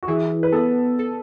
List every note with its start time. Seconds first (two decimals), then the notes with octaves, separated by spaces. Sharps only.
0.03 F#4
0.08 E3 G#4
0.43 B4
0.52 B3 A4
0.99 A4